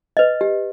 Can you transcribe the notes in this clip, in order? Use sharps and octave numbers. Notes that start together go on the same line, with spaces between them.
B4 D#5
G4